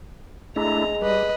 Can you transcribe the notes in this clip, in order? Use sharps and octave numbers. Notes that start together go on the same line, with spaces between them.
G#3 A3 D4 E4 A#5
G3 B4 D#5